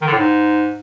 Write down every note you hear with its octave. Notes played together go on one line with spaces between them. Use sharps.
D#3
D3
A2
G#2